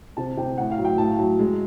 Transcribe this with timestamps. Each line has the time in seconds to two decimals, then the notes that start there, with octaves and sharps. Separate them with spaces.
0.17 C3 A5
0.37 C3 G5
0.58 A2 F#5
0.72 F5
0.79 F#3
0.85 G5
0.98 A2 A5
1.19 F#3
1.39 G#3